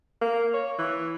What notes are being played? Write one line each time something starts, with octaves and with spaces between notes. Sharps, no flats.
A#3
C#5
E3